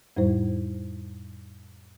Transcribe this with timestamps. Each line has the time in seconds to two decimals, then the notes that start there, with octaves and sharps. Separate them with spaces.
0.17 F2 A2 G3 E4 C5